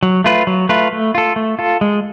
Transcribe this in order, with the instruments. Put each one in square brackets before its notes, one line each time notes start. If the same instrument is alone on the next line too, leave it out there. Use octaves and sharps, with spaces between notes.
[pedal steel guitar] F#3
A3 F4 B4
F#3
A3 F4 B4
A3
F4 A4
A3
F4 A4
G#3